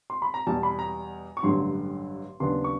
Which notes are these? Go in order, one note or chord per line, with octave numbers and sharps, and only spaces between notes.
C6
B5
A#5
E2 B2 G3 A5
B5
A#5
C#6
A1 G2 D3 F#3 C6
D#2 C#3 F#3 B3 D4 C6
C#6